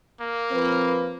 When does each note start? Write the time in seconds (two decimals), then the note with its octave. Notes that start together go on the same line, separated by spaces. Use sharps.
0.21 A#3
0.52 F3 C4 B4